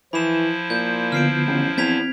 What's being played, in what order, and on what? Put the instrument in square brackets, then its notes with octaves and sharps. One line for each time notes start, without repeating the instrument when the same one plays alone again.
[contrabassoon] E3 [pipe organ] F3 E4 [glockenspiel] B5 E7
[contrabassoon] A#2 [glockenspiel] G6
[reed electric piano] D3 B3 F4 [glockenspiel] F6 C7 D7
[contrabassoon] A1
[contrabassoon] E2 [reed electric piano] C4 [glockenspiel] G#6 B6 F7